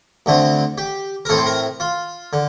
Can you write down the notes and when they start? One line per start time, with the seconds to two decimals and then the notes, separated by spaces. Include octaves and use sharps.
0.26 D2 D3 A3 C4
0.78 G4
1.25 A#4
1.29 A2 A3 C4 A4
1.38 C5
1.46 A#4
1.80 F4
2.33 D3